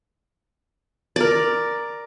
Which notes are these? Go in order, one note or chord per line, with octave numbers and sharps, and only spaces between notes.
A#4 D5